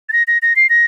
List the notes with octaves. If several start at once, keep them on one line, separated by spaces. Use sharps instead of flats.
A6
A#6
A#6
A#6
C7
A#6